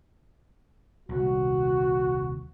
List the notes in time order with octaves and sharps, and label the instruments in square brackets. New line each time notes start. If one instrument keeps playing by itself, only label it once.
[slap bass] D#1 C2 [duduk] F#4